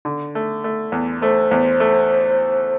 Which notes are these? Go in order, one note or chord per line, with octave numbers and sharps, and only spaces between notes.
D3
A3
A3
E2
A3 C5
E2
A3